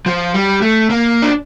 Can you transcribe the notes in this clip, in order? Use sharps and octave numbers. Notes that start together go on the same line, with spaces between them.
F3
G3
A3
A#3
D4